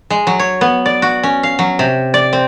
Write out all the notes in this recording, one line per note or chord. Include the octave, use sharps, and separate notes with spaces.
G#3
F#3
C#5
B3
D5
F#4
C#4
F5
F#3
C3
D5
C4